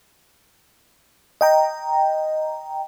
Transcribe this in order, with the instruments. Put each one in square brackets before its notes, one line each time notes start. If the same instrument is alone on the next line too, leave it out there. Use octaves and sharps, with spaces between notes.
[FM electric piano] D#5 G5 A#5